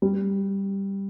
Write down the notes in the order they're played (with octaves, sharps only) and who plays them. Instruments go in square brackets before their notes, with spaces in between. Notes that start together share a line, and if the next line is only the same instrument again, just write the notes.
[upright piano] G3